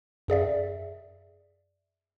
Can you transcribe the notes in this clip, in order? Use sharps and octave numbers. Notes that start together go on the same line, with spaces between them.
F#2 G#4 D5 E5